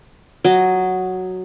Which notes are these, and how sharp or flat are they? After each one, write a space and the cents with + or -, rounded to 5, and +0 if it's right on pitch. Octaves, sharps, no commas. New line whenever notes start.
F#3 +0 D#5 +0